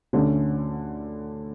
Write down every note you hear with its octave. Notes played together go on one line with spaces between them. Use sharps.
D2 D3 A3 C#4